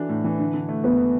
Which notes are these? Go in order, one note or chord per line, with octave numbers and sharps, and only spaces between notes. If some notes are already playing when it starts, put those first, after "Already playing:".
Already playing: E3 D4 F#4 A4
A2
E3
D3
D3
A3
E2 B3